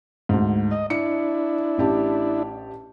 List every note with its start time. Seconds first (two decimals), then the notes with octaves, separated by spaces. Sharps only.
0.29 D2 G#2
0.71 D#5
0.90 D4 E4 C#7
1.78 A1 G4 A5